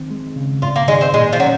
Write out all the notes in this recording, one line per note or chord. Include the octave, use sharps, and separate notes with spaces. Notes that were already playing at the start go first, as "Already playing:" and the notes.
Already playing: D#3 C4
G#3
C#3
G#2 F4
A#3
D#3 G#3
C4
A#2 G#3
F3
F#3 C#4